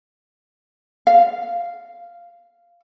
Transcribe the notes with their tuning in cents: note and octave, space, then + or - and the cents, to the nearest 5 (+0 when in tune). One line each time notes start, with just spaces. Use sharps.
F5 -10